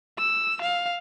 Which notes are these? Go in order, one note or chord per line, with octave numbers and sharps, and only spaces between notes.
E6
F5